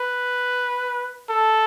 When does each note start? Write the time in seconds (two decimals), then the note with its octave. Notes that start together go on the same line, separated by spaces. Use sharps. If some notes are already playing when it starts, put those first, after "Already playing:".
Already playing: B4
1.29 A4